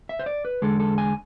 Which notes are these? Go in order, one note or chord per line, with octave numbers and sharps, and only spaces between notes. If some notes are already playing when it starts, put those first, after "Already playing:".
E5
C5
D5
B4
E2 D3 G#3 A4
A4
G#5